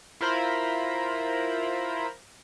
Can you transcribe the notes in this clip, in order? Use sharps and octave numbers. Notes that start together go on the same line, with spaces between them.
E4 F4 A#4 C5 A#5 B5